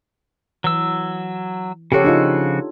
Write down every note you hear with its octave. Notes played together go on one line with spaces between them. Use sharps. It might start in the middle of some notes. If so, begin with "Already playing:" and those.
E3 F#3 E6
C#3 F3 F#4 G4 A4 C#5
D4 D#4 F4